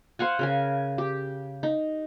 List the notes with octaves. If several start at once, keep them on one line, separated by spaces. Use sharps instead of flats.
C5 F5 F#5 G#5
C#3 A#4 G#5
G4
D#4